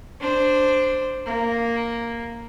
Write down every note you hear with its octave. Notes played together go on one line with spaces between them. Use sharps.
D4 C5
A#3